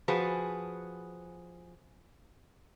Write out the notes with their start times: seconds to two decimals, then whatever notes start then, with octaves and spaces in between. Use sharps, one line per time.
0.08 F3 F#4 G#4 B4 C5